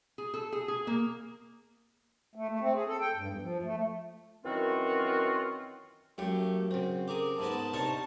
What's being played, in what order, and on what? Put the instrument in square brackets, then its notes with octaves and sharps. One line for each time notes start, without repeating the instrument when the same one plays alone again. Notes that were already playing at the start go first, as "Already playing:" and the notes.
[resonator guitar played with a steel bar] G#4
A4
G#4
G#4
A#3
[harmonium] A3
A3
C4
G#4
A4
G5
G2
E2
F3
A3
[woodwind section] F#2 D#3 E3 C4 F4 F#4
[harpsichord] F#2 [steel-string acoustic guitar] A3 G4 [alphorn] A#3
[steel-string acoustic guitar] C#3 C4 [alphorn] F#4
[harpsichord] G4 G#4 [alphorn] A#4
[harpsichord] G#2 G#3 B3 [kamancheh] A5
[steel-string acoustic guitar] C3 D#4 [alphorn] D4 [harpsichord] A#4 C#5